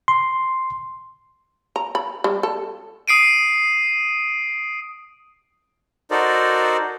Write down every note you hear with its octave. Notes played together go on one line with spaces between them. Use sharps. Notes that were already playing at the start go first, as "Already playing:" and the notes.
C6
A#5
B5
G3
A4
D#6 C7 D7 D#7
D#4 F#4 A4 A#4 C5 D5